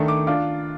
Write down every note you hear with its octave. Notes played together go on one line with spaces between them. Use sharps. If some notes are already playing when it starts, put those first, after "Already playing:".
Already playing: D#3 A3 D4
D6
D4 F4 D6